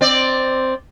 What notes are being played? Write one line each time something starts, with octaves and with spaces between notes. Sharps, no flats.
C4 D5